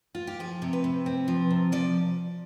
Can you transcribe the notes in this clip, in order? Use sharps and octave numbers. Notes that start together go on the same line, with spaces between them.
F4
G4
F3 G#4
C3
B4
C3
C4
F3
C3
F3 D5